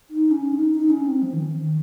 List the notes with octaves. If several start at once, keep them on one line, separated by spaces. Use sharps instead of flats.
D#4
C#4
D#4
D#4
C#4
C4
F3
D#3
D#3